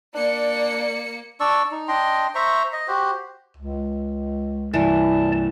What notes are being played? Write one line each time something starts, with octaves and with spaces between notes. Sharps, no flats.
A#3 D4 D5 C#7
D4 D5 C#6 E6
D#4
D4 D#5 G5 C6
C5 E5 A#5 C#6
D#5
F#4 G4 C5
C#2
C2 G2 C3 E3 D5 A5